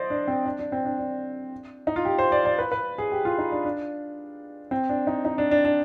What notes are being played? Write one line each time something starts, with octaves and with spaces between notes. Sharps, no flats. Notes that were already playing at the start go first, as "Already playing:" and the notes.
Already playing: C5 D5 D#5
D4
C4
D4
D4
C4
D4
D4
D#4
F4
G4
C5
D5
D5
B4
B4
G#4
G4
F4
D#4
D4
D4
C4
D4
D#4
D#4
D4
D4
D4